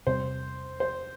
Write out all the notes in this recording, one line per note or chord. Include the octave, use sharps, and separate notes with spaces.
E2 C3 G3 C4 C5
C5